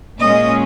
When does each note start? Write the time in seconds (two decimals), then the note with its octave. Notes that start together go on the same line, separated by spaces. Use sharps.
0.20 A#2 G#3 C#4 D#5